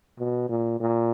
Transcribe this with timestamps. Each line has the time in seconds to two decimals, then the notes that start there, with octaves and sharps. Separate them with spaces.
0.19 B2
0.49 A#2
0.80 A#2